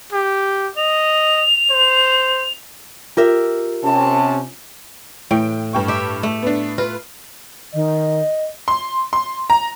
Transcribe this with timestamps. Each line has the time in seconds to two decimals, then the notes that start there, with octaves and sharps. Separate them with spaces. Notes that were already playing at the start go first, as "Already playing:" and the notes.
0.12 G4
0.77 D#5 F7
1.71 C5
3.17 F4 G4 A#4 E5
3.84 C3 C#4 A5
5.31 A2 E3 G5 D7
5.73 G2 G5 C#6
5.88 G4 E5
6.23 A3
6.42 B3 D4
6.78 F4 B4
7.74 D#3 D#5
8.68 C6
9.13 C6
9.50 A#5